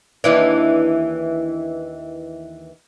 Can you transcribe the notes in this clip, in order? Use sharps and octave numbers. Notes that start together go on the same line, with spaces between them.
D#2 E3 D4